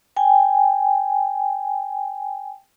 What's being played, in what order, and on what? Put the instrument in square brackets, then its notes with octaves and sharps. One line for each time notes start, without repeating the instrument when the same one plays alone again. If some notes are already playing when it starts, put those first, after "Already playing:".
[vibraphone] G5 G#5